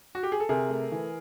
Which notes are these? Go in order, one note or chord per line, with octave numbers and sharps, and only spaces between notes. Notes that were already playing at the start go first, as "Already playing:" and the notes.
F#4
G4
G#4
A4
C3 G#4 A#4
A3
E3